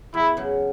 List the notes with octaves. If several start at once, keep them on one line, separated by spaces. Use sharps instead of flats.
E2 E4
C#3 F#3